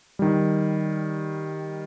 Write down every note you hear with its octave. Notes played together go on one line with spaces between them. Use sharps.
D#3 G3